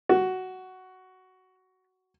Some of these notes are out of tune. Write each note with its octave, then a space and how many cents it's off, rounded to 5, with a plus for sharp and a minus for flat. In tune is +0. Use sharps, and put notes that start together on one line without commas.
F#4 +10